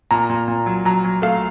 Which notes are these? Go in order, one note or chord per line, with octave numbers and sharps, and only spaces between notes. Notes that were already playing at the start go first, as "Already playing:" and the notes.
A#2 A#5
A#2
A#2
F#3
F#3 A#5
F#3
A3 F5